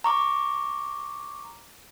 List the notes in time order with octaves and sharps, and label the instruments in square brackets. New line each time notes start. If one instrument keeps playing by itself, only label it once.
[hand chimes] A#5 C#6 D6